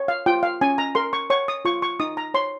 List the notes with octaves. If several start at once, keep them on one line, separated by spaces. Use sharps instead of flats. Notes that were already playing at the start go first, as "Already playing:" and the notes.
Already playing: C#5
F5
F4 G5
F5
C#4 G#5
A#5
A#4 C6
C#6
C#5 C#6
D#6
F4 C#6
C#6
D#4 D#6
A#5
C#5 C6